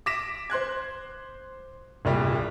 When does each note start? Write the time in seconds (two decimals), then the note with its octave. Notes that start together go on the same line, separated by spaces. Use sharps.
0.06 D6 A#6 B6 E7
0.50 C5 C6 F#6 G#6
2.05 D1 C2 A#2 G3